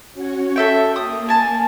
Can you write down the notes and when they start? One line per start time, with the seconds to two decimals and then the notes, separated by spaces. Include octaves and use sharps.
0.13 C#4 F#4 C#5
0.56 A4 E5 G5
0.96 A#3 D#6
1.29 G#5 A5